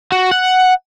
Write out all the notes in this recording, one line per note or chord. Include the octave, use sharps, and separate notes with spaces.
F#4
F#5